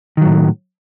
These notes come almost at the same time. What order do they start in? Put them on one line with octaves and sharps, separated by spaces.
D#3 F#3 A2